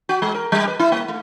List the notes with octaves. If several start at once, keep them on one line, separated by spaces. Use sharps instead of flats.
F#4
G#3
A#4
G3
B4
E4
A#3
A3